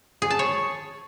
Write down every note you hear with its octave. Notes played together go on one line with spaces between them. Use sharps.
G#4
A5
C#5